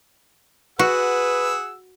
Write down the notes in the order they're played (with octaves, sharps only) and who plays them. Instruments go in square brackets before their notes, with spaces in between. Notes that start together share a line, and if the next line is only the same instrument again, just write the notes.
[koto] F#4 [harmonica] G#4 F#5 E6 [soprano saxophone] B4